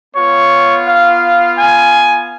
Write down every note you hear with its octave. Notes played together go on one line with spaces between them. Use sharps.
B3 F4 C#5
F5
G#5